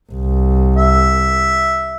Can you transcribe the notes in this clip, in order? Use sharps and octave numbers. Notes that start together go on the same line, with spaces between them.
C2
E5